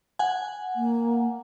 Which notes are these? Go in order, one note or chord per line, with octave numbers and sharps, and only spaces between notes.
F#5 G#5
A#3